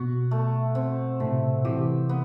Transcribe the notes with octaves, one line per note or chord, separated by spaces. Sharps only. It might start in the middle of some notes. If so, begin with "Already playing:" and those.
Already playing: B2 F#4
A3
B2 C4
A2 C3 A3
C3 E3 G4
B3